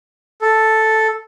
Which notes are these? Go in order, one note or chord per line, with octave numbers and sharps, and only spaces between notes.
A4